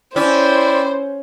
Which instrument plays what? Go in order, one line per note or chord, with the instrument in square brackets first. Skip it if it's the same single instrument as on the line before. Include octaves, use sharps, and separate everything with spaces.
[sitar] C#4 [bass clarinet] E4 [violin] C5 [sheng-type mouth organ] D5 G5 E6